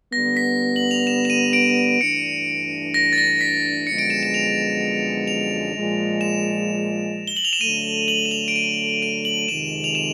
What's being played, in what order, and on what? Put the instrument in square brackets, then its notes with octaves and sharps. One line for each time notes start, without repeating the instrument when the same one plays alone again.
[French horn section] D3 G3 B3 [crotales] A#6
[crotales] B6
F#7
F7
E7
E7
D#7
D7
[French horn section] G2 E3 A3 D4 [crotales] C#7
[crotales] A#6
A6
A#6
B6
[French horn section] F#2 D3 F3 G#3 B3 [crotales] C#7
[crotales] D7
E7
E7
F7
F7
[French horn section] A#2 F3 G#3
[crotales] E7
G7
F#7
F7
E7
[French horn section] D3 F#3 A3 [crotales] D#7
[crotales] F#7
E7
F7
D7
D#7
D#7
F#7
[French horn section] F2 C3 D#3 G#3 [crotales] E7
[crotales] F7
E7